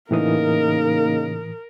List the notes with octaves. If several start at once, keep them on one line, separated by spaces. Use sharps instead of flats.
A2 C#3 E3 A#3 D#4 A#4 D#6